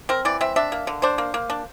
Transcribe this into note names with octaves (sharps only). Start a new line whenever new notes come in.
C4 A#4
E3 D5
C4 E5
D4 E5
A#3
D3
D4 C5
A#3
A#3
D4